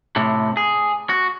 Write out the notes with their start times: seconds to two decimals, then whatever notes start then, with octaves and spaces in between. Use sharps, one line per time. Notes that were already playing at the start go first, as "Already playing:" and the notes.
0.16 A2 C3
0.57 G#4
1.09 F#4